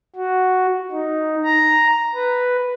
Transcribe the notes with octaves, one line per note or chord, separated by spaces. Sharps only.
F#4
D#4
A#5
B4